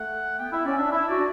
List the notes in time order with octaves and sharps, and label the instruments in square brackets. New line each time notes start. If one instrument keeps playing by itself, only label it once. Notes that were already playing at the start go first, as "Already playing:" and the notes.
Already playing: [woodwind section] A3 [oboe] F#5
[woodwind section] B3 [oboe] G5
[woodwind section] E4 [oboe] E5
[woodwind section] C#4 [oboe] D5
[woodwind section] D4 [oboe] E5
[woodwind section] E4 [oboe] E5
[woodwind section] F#4 [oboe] D5
[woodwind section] D4